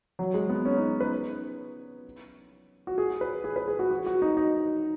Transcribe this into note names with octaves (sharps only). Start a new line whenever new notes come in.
F#3
G#3
B3
C#4
D#4
B4
F#4
G#4
B4
G#4
B4
G#4
F#4
F#4
F#4
D#4
D#4